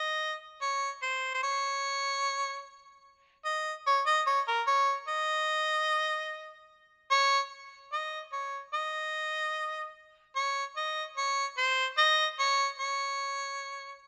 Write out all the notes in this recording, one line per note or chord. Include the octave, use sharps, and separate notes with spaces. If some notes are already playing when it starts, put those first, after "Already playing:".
Already playing: D#5
C#5
C5
C5
C#5
D#5
C#5
D#5
C#5
A#4
C#5
D#5
C#5
D#5
C#5
D#5
C#5
D#5
C#5
C5
D#5
C#5
C#5